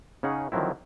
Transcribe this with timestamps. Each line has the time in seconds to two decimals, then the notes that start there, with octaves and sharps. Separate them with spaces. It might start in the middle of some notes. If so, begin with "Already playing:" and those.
0.23 C#3 C#4 D#4 G#4 F#5
0.52 D3 D#3 F3 F#3 C4 E4